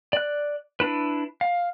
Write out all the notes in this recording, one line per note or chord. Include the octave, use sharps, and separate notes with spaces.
D5 F#6
D4 E4 B4
F5